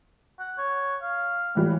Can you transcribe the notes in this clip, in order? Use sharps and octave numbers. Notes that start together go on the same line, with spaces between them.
F#5
C#5
F5
A2 E3 G3